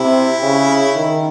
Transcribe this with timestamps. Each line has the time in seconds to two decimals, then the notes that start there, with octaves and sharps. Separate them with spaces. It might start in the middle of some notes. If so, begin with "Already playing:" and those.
Already playing: C3 E4
0.43 C#3
0.96 D#3